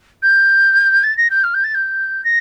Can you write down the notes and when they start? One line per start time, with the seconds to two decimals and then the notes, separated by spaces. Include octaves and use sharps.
0.22 G6
1.03 A6
1.17 A#6
1.30 G6
1.43 F6
1.54 G6
1.64 A6
1.74 G6
2.24 A#6